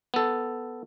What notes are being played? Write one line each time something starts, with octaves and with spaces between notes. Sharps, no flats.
B3 A4